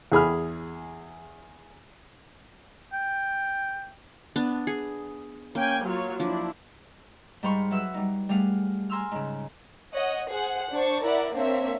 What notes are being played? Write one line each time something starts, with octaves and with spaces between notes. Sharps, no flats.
E2 G#4 B5 F6
G5
B3 D4
G#4
A#3 C#4 G5 G#5
F#3 F4 C#5
F3 D4 E4
G#2 G3 C5 F5 B5 C#6
F#3 B4 E5 F#5 E6
G3 D#4
G3 A3 G#4 F5 F#5
G#5 A#5 C6 E6 F6
G#2 C#3
C#5 D#5 F#5
G#4 C5 F#5
D4 C5 A5 C#6
E4 A#4 D5 E5 F#5
A#3 C4 D4 C#5 E5